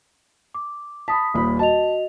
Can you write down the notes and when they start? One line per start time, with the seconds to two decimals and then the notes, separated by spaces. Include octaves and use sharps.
0.54 D6
1.08 A5 B5 D#6 B6
1.34 D#1 A#2 B5
1.59 F#4 D#5 A5 F7